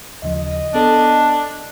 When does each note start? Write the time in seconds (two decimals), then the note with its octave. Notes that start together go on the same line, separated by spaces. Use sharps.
0.23 D#2 C#3 F3 D#5
0.74 B3 D4 A4